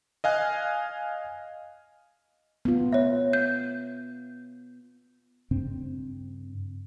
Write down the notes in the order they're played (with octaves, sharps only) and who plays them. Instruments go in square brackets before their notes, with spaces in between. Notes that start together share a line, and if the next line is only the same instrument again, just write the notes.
[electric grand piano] D#5 F5 G#5 F#6
[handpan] B3 F4
[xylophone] C#5 E5
G6
[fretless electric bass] G2 C#3 C4 D4